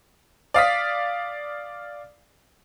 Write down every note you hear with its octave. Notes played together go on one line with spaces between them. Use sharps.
D5 F5 D#6 B6